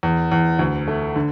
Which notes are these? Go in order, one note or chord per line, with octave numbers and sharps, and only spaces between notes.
E2
E2
D2
A3
D3